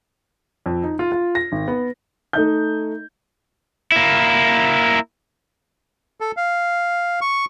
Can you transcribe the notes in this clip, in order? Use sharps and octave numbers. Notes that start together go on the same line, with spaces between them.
F2
D#4
F4
F4
A#6
G#1
B3
A3 D#4 G6
A#3 E4
A4
F5
C#6